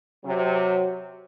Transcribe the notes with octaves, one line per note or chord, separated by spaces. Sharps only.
C3 F#3